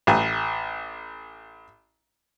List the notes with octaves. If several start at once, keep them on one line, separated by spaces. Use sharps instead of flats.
A1 G#5